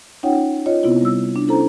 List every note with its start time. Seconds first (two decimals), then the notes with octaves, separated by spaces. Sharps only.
0.23 C#4 D#4 F4 C#5 F#5 G5
0.66 F4 C#5 D#5
0.83 C3 B3 C4 E4 F4
1.01 G3 E6
1.36 D4
1.48 C#4 E4 A4 C5 A#5